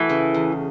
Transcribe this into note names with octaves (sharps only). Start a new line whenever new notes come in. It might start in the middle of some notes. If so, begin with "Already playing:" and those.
Already playing: E3 A3 F#4
C#3
E2